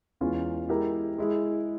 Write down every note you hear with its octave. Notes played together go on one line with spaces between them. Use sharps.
E2 E3 G#3 C#4 F4
G#3 E4 G4 A#4
G#3 E4 G#4